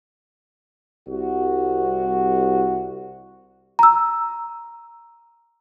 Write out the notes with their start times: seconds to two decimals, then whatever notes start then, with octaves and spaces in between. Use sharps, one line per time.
1.08 C2 F#4
3.79 A#5 E6